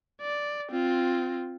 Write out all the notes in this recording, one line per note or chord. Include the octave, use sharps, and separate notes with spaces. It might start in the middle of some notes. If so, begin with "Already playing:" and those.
D5
C4 F4